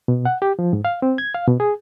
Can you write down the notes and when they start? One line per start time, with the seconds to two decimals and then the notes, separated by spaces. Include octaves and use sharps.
0.08 B2
0.25 F#5
0.42 G4
0.59 F3
0.73 G#2
0.85 F5
1.02 C4
1.18 G#6
1.34 F5
1.48 B2
1.60 G#4